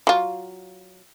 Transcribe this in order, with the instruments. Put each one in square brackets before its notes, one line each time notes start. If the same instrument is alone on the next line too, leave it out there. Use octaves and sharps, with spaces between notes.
[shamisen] F#3 F4